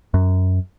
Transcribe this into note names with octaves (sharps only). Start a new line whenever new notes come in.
F#2